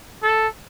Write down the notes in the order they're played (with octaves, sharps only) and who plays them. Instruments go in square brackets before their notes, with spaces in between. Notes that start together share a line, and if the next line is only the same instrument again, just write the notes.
[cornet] A4